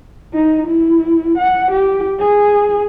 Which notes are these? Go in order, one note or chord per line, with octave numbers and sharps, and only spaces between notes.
D#4
E4
F#5
G4
G#4